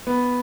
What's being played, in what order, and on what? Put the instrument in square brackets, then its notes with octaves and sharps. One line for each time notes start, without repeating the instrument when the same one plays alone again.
[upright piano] B3